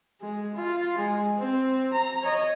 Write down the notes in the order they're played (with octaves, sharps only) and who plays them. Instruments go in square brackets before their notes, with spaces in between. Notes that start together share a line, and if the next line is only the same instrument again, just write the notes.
[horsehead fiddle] G#3
F4
G#3
C4
A#5
C#5 D#5